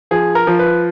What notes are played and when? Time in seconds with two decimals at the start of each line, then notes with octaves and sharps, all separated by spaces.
0.11 F3 G#4
0.35 A#4
0.47 F3
0.59 B4